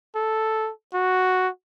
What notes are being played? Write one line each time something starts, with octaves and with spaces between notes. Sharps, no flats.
A4
F#4